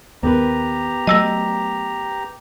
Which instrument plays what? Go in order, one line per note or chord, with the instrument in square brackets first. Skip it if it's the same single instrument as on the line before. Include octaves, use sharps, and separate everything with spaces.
[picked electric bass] D#2 [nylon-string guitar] B3 A#4 B4 [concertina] G4 A#5
[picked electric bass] F#3 A3 [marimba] D#5 E6 A#6